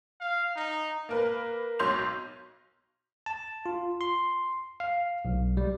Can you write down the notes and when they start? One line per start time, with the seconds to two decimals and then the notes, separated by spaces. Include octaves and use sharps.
0.20 F5
0.56 D#4
1.09 A#3 A#4 B4
1.79 B1 C#5 C6 G6 F7
3.26 A5
3.66 F4
4.01 C6
4.80 F5
5.25 B1
5.57 G3